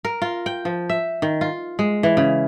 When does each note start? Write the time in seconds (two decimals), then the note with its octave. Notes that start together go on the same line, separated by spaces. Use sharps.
0.05 A#4
0.22 F4
0.46 G5
0.65 F3
0.89 E5
1.22 D#3
1.41 F4
1.79 G#3
2.03 E3
2.17 C#3